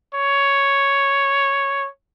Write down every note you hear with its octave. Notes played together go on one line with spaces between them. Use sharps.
C#5